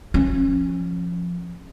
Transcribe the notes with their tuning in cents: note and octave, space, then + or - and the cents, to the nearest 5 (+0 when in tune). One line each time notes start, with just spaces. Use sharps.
F3 +0 C#4 -25